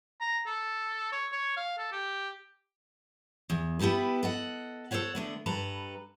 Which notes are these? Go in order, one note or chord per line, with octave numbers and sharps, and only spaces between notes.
A#5
A4
C#5
C#5
F5
A4
G4
E2
B3 E4 G4 A4 B4
A4 D#5 F#5
A4 A#4 C5 C#5 F#5
D3 A3 B3
G2 A4 B4 A#5